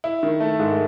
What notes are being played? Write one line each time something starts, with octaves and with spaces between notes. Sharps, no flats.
E4
D#3
A3
G#2